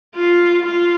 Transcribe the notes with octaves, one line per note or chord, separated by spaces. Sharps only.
F4
F4